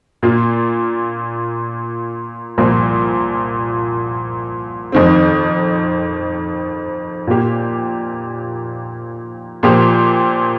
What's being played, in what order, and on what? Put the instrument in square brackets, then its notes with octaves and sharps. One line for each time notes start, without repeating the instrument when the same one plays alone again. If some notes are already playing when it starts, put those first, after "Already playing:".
[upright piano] A#2 A#3 F4
C2 A#2 F3 A#3
F2 D#3 C4
A#2 A#3 G4
A#2 F3 A#3 G4